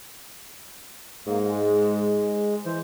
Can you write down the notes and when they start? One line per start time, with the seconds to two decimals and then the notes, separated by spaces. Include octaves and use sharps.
1.27 G#2 A#3
1.43 G#3
2.65 E3 C5